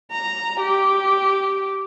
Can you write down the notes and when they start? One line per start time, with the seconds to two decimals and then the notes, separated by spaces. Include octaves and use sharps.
0.11 A#5
0.60 G4